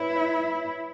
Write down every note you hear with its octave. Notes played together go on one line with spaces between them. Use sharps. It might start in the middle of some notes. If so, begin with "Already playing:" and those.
Already playing: E4 B4 C#5
C#5 E5